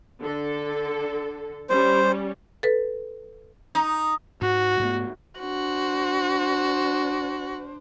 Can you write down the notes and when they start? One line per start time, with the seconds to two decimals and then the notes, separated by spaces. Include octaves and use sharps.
0.21 D3 A4
1.70 G3 C#4 C5
2.63 A4 B4
3.75 D#4
4.41 G#2 F#4
4.80 G#2 A3 B3
5.40 D4 F#4 C5